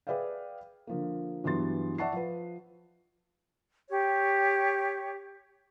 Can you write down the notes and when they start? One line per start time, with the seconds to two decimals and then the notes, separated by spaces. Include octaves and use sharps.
0.07 G#4 B4 D5 E5 F5 G5
0.87 D3 F3 A#3
1.44 G2 E3 F#3 B3 C6 A6
1.98 D5 E5 F#5 A5 C#6 C7
2.13 F3 B4
3.90 G4 C#5